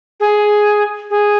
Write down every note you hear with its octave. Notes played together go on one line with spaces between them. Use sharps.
G#4
G#4